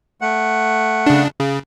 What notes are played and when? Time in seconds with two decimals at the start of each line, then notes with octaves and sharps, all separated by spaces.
0.21 A3 F#5
1.06 C#3 D4
1.40 C#3